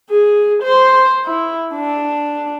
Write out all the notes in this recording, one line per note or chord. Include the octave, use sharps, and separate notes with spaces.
G#4
C5
E4
D4